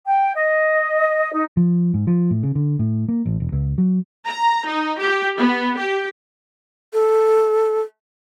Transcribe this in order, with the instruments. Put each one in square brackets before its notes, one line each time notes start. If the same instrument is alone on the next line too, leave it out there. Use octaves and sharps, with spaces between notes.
[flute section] G5
D#5
D#4
[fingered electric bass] F3
G#2
F3
A2
C#3
D3
A2
A#3
A1
E1
C#2
F#3
[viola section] A#5
D#4
G4
B3
G4
[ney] A4